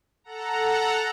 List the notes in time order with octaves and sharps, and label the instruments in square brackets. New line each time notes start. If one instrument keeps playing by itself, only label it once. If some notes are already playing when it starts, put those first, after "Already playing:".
[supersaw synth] A4 F#5 A#5